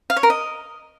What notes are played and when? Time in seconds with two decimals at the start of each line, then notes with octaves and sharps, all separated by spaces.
0.10 F5
0.16 C#5
0.23 A#4
0.30 D#5